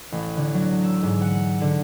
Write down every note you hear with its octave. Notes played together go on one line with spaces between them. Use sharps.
A1
D3
F#3
E6
G#2
F#5
D3